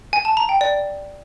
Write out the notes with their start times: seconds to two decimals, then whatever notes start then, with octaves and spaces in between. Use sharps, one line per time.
0.13 G#5
0.25 A5
0.37 A#5
0.49 G5
0.61 D5